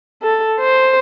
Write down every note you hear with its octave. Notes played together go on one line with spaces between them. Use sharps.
A4
C5